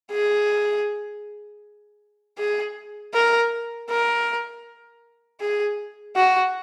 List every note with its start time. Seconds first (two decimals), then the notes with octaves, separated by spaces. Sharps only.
0.12 G#4
2.38 G#4
3.14 A#4
3.90 A#4
5.40 G#4
6.16 F#4